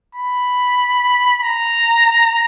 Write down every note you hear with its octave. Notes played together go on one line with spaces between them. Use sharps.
B5
A#5